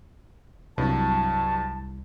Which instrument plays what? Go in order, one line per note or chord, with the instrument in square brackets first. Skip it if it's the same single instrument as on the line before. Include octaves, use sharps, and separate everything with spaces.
[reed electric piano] C2 [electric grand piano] G2 F#3 [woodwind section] A5